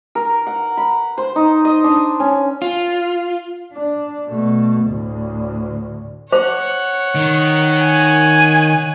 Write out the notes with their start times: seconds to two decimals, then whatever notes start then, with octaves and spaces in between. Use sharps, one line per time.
0.15 A#4
0.47 F#5
0.77 B5
1.18 C5
1.36 D#4
1.65 D#5
1.84 D4
2.20 C#4
2.62 F4
3.73 D4
4.27 B2 A3
4.84 D2 A2
6.32 C5 C#5 F#5
7.15 D#3
7.82 G#5